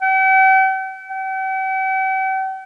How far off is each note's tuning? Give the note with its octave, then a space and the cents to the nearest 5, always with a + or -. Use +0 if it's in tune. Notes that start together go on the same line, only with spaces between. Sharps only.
G5 -45
G5 -45